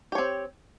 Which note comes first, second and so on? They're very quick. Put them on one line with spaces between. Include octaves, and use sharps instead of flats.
G4 C#5 C4